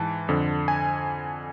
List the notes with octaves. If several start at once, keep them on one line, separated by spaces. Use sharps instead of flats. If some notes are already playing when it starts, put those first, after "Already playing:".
Already playing: G#2 E3 A5
F2 D3
G#5